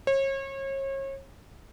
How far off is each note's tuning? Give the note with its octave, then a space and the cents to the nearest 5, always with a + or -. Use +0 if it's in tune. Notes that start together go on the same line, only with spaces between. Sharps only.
C#5 -35